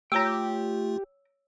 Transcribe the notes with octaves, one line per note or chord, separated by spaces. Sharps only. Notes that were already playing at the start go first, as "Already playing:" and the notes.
A3 F4 G4 C#5 G5 G#5 A#5 E6